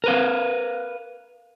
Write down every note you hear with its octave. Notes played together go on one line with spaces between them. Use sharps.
A#4 B4 F5